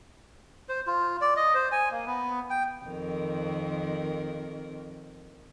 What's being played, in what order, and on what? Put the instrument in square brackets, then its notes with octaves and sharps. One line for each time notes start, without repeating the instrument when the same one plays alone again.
[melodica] C5
F4
D5
D#5
C5
G#5
A#3
B3
G5
[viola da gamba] F2 D#3 A#4